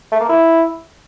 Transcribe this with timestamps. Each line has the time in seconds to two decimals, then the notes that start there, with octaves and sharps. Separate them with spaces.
0.12 A3
0.20 A#3
0.29 E4